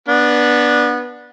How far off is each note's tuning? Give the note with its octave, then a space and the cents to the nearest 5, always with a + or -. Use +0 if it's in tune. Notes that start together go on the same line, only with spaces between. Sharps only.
B3 -20 D4 +0